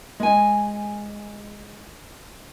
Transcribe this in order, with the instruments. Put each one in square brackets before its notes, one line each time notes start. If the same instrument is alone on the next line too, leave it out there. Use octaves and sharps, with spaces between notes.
[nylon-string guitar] G#3 G#5